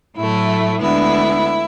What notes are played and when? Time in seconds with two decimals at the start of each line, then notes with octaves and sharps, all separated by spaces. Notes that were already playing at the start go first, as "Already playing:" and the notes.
0.17 A2 F#3 A3 E4
0.81 D2 D3 G#3 B3 E4